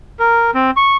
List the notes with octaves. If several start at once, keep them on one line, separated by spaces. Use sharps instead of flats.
A#4
C4
C#6